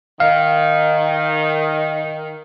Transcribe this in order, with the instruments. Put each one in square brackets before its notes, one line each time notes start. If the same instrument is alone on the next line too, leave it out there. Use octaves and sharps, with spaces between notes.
[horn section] D#3 [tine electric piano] F5